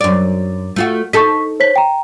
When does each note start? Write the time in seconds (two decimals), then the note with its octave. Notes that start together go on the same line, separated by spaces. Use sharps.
0.01 F#2 D5
0.76 A3 F4 F#4
1.13 D#4 A4 C#6 B6
1.60 C5 C#5 B6
1.76 G5 A#5